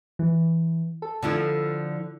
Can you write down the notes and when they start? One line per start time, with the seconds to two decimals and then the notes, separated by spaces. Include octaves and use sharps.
0.19 E3
1.02 A4
1.23 D3 F3 E4